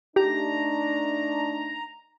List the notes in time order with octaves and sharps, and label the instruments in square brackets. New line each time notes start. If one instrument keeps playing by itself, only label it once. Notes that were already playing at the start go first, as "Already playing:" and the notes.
[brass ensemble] A3 D4 D#4 [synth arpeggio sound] G4 [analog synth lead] A#5